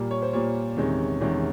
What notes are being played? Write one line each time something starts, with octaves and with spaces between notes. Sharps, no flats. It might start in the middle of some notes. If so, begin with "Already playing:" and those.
Already playing: A#2 G3 A#3
C#5
C5
A#2 G3 A#3 C#5
E2 C3 D#3 G#3 C#4
E2 C3 D#3 G#3 C#4